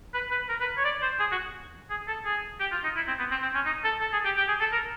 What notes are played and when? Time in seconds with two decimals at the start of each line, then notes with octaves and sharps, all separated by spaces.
0.14 B4
0.31 B4
0.49 A#4
0.61 B4
0.77 C#5
0.85 D5
1.02 C5
1.19 G#4
1.32 F#4
1.90 G#4
2.08 A4
2.25 G#4
2.60 G4
2.72 F4
2.84 D#4
2.96 E4
3.08 C4
3.19 B3
3.31 C4
3.42 C4
3.54 C#4
3.66 D#4
3.84 A4
4.01 A4
4.13 G#4
4.25 G4
4.37 G4
4.48 G#4
4.60 A4
4.72 A#4